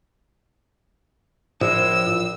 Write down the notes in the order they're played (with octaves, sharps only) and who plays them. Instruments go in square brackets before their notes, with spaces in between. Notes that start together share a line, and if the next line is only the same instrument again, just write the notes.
[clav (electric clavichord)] A#1 [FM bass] A2 [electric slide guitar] F3 [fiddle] E6